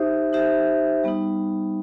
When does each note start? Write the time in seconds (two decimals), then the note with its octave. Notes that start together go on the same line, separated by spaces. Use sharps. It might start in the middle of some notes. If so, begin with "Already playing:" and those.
Already playing: D#4 G4 C5 E5
0.33 D#4 G4 C5 E5
1.04 G3 B3 D#4